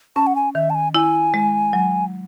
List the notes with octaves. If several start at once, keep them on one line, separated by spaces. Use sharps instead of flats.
C#4 A5
F#5
G#5
D#3 E5
A5
G#5
E4 G#5
G#3
F#3